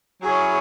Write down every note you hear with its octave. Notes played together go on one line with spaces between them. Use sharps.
F#3 C#4 E4 G#4 C#5